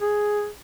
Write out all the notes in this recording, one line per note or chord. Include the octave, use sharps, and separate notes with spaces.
G#4